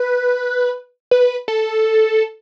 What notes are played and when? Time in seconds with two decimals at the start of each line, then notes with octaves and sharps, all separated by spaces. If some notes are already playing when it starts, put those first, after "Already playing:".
Already playing: B4
1.11 B4
1.48 A4